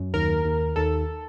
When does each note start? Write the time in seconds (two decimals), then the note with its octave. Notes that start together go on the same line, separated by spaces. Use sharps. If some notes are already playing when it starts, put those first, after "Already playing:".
Already playing: F#2
0.14 D#2 A#4
0.45 D#2
0.76 D#2 A4